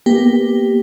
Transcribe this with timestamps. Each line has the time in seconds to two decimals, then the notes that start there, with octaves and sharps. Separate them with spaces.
0.06 A#3 B3 G4